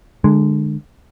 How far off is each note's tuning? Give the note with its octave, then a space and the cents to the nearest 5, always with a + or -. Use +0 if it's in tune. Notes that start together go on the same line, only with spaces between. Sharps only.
D3 +25 G#3 +0